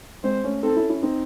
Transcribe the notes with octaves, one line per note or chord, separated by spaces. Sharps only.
G#3 C4 C5
A3 C#4
C4 D#4 A4
C#4 E4
C#4 E4
C4 D#4